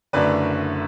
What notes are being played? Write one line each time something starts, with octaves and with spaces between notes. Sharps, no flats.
F#1 F#2 D3 A3 D4 B4 D5